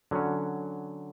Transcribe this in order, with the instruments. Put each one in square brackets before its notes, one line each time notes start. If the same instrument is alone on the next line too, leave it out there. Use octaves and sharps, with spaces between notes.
[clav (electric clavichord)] D3 F#3 C#4